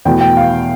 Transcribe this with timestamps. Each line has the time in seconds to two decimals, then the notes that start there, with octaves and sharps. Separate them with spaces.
0.05 E2 B2 A3 G5
0.21 G5
0.37 F5